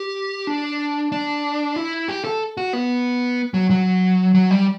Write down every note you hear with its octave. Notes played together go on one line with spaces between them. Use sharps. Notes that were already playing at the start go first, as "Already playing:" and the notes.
Already playing: G4
D4
D4
E4
G4
A4
F#4
B3
F#3
F#3
F#3
G3